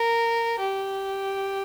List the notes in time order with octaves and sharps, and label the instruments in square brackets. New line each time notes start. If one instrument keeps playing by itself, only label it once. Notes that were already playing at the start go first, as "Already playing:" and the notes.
Already playing: [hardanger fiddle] A#4
G4